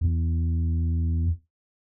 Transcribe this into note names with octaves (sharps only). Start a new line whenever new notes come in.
E2